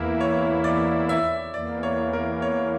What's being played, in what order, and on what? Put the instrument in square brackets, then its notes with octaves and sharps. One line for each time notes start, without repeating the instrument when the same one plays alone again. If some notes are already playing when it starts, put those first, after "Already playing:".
Already playing: [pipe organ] E2 E3 A#3 E4 [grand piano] A#4
[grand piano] C#5
D5
E5
[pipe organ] E2 E3 A#3 [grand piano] D5
[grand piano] C#5
A#4
C#5